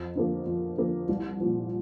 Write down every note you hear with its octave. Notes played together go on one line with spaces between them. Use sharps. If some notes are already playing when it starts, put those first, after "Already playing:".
Already playing: F2
D3 F3 A#3
F2
D3 F3 A#3
C2
A#2 F3